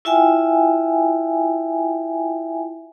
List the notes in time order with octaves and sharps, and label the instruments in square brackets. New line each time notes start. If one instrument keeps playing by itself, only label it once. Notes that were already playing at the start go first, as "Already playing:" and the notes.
[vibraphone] E4 F4 E5 G5 G#5